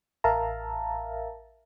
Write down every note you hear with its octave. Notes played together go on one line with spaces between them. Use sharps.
A1 A#4 E5 F5 A5 A#5